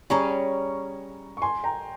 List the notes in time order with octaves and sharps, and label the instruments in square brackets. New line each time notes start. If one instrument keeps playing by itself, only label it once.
[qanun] G3 C#4 G#4 [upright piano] A#5 C#6
[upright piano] C#6
G#5 C6
G5 A#5